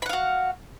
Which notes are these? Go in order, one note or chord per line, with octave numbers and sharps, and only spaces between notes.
F#4 F5 F#5 B5